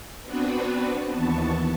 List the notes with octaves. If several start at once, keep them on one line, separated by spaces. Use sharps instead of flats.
B3 C4 D4 F#4 B4
D#2 E3 B3 A5 C#6